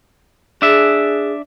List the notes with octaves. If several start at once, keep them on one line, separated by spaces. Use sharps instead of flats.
D4 G#4 E5